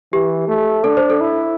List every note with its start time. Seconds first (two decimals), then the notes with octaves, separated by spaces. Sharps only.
0.13 E3 G4
0.48 A3
0.84 D4 A4
0.97 C5
1.10 A4
1.21 E4